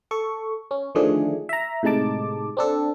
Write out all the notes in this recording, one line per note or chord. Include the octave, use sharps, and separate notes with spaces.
A4 C#6
C#4
D3 D#3 F3 A3 D4 G#4
E5 A#5
A2 C3 G#3 D#4 A5 D6
C4 D4 A4